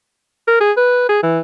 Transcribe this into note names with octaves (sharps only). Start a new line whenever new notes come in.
A#4
G#4
B4
G#4
E3